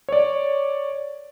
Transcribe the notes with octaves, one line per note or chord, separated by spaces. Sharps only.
C#5 D5